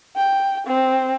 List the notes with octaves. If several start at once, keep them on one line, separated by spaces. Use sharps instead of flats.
G5
C4